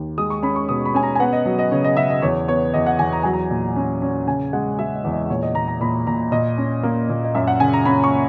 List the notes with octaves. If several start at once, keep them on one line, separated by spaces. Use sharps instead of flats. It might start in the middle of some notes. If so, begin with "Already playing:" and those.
Already playing: D#2
G#3 D#6
C#6
C#4 B5
C#6
B2 D#6
B5
C#4 G#5
A#5
G#5
B3 F#5
D#5
F#3
D#5
C#3 C#5
D#5
C#3 E5
D#5
E2 C#5
B3 C#5
E2 D#5
F#5
E2 G#5
A#5
F#3 G#5
A#5
A#2
C#4
C#4
C#3 G#5
G#3 F#5
G#3 E5
D#5
E2
D#5
A#2 C#5
D#5
A#2 A#5
A#5
A#2 B5
A#2 A#5
A#2 D#5
C#4
A#3
A#2
D#5
F#2 E5
F#5
C#3 G#5
A#5
C#4 B5
C#6